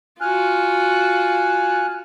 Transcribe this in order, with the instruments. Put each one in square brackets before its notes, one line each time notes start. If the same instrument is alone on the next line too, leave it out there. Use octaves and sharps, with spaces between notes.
[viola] F4 F#4 [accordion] G#5 F6 F#6